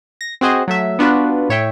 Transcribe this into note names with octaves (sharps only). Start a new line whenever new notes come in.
A#6
C4 F#4 G#4 C5 D#5
F#3 A3 E5
B3 D4 F4 F#4 B4
A2 C#5 E5 G5